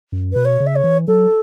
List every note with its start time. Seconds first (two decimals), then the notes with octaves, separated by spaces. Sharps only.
0.12 F#2
0.33 B2 B4
0.45 C#5
0.60 C#3
0.66 E5
0.75 C#5
0.84 E3
1.07 F#3 A4